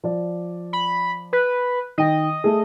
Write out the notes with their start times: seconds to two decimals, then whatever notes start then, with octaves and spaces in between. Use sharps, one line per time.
0.04 F3 D5
0.73 B5
1.33 B4
1.98 D#3 D#5 G5
2.44 A3 G#4